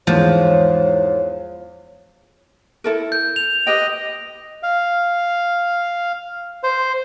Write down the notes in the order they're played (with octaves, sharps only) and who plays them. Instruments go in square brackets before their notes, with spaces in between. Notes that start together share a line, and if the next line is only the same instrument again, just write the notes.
[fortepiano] E2 G#2 [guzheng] F3 [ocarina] C#5
[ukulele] E4 A4 A#4
[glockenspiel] G6
F7
[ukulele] G4 B4 G5 [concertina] D#5
[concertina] F5
C5